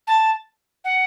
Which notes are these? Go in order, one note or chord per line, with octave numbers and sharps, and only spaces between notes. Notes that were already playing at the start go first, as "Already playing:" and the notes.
A5
F#5